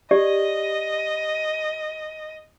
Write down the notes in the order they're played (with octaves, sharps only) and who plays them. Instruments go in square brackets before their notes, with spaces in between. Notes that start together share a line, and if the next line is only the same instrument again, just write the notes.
[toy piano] G4 D5 [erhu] D#5